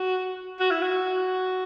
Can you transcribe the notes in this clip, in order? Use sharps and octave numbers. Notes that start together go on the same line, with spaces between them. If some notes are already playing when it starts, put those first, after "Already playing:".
Already playing: F#4
F#4
E4
F#4